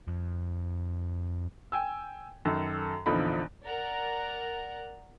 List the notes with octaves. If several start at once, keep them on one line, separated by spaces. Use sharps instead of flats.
F2
G5 G#5 E6
F#2 D#3 A4
A#1 E2 D3 F3 D#4 B5
A#4 D5 F#5 A#5